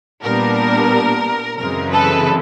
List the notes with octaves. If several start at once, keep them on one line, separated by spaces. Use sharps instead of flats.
A#2 G3 B3 D4 A#4
F#2 C#3 E3 G#3 C4 A#4
A4 B4